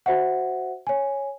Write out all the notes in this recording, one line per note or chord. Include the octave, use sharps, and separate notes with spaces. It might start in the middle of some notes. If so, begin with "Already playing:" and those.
F#4 C5 E5 F#5
C#5 G#5